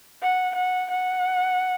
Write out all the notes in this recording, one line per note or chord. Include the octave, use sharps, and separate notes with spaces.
F#5
F#5
F#5